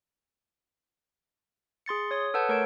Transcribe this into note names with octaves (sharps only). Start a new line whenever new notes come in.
G#4 C6 A6 C#7
C#5 D#6
A4 B4 F#5 A5 G6
A3 A#4 C#5 D7